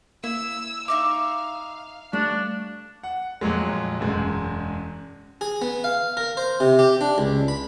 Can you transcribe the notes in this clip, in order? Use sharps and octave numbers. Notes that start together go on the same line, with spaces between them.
A#3 E4 E6
D#4 E5 F5 D6
D#6
G3 A3 C#4 D4
F#5
F2 A#2 F#3 G#3
E1 F#2 G#3
G#4
B3
F5
A#4
C5
C3
G4
D4
C#2
B5